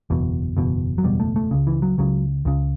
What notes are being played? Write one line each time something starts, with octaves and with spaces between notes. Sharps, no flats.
F#1 E2 B2
F#1 E2 B2
F#3
F#1 E2 B2 G3
A3
A3
C#2 C#3
E3
F#3
C#2 C#3 F#3
C#2 C#3